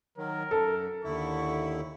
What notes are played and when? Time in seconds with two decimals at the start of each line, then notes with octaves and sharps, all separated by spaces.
0.18 D#3 F#3 A#4
0.51 F#2 A4
1.04 D#2 D3 E4 C#6